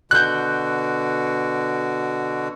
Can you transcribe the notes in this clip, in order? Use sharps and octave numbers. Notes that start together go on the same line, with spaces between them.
B2 D3 F#4 F#6 G6